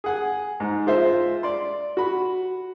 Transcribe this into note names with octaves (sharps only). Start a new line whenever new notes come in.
G#4 F#5 G#5
G#2
G#3 F4 C5 E5
D5 C6
F#4 B5